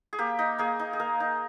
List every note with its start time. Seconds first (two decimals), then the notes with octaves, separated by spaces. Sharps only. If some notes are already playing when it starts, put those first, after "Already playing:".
0.13 G#4
0.18 A#3 G4
0.39 D#4
0.58 A#3 G#4
0.79 D#4
0.93 G#4
1.00 A#3 A#4
1.20 D#4